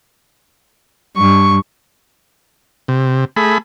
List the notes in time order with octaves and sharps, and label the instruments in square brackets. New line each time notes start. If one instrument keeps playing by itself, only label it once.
[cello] G2 [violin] C#6
[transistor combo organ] C3
A3 G#4 B5